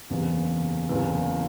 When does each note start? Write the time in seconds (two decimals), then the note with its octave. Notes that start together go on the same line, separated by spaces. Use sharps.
0.10 F#1 E2 C3
0.89 F#1 E2 C3 E3